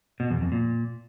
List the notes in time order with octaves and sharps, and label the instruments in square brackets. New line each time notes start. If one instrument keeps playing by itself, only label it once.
[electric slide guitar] B2
E2
F2
A#2